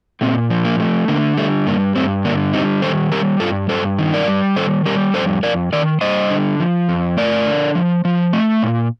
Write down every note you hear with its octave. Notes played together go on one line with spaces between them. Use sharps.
A#2 A3 C4
F3
A#3
A3
D3 A#3
G3 A3
G2 A#3
G2 A3 C4
D3 A#3 D4
G3 C4 D#4
D#3 A4 C5
G3 G4 A#4
G2 F4 A4
G2 A4 C5
D#3
A#4 D5
G3
D#3 A4 C5
G3 G4 A#4
F2 A4 C5
F2 A#4 D5
D#3 A#4 D5
G3 C5 D#5
D3
F3
F2
A3 A#4 D5
D3
F3
F3
A3
A#2